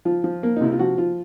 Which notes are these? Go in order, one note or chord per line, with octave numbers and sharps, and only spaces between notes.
F3 F4
F3
A#3
D#4
C3 E4
F4
F3 F#4
F3 F4